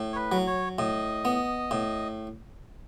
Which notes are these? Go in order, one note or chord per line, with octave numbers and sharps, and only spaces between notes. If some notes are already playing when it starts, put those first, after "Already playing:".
Already playing: A2
C#5
B4
F#3
C#5
A2 D#5
B3
A2